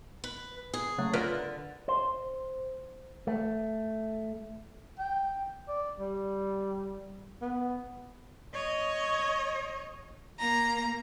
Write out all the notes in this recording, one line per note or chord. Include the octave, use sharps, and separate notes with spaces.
B4
G#4
C#3 F#3 A3
D3 F4 A#4 B4
C5
A3
G5
D5
G3
B3
C#5 D#5
A#3 A#5